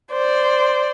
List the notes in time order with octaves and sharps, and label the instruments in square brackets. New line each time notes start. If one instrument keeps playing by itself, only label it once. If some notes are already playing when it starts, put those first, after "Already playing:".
[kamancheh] C5 D5